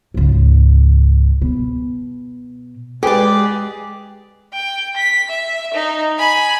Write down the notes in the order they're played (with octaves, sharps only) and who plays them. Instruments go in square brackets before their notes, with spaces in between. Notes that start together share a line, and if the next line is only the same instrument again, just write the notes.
[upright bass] C#2 G#2
B2
[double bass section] G#3 [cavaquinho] G4 D5 [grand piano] G#4 B4
[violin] G5
B6
E5
D#4
G#5 B5